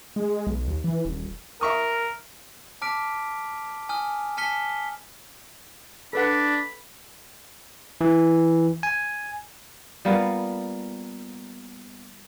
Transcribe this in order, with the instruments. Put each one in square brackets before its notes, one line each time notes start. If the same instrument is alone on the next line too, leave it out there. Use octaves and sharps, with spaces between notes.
[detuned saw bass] G#3
B1
D#2
E3
D#1
[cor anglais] A#4 [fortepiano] E5 C#6 D#6
[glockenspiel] A5 D6 F6 B6 D7
G#5 D#6 F6
G#5 A5 F6 B6 C#7 G7
[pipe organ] D4 [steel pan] A4 B4 F#5 [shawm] B5
[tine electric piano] E3
G#5
[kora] G3 A#3 B3 F4